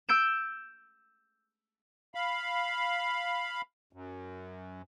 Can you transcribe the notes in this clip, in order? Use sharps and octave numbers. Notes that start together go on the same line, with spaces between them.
E6 G6 D7 E7
F5 B5
F#2